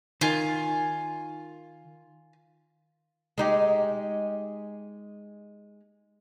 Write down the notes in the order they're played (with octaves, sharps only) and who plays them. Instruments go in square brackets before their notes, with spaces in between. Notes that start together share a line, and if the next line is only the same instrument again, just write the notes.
[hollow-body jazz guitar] D#3 [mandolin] F4 G#5
[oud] G#3 D#4 G4